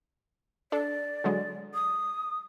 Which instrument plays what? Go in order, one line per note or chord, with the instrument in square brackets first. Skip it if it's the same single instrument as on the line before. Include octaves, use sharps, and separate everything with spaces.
[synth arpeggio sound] D4 A4 [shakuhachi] D5
[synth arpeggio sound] D3 F#3 G#3
[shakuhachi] D#6